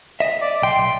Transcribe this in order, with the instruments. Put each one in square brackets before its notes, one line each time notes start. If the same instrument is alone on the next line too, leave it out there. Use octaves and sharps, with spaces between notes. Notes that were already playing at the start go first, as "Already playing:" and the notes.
[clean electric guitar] D#5 E5
[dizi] D5
[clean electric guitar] B1 G5 [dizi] C6
[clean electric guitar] B1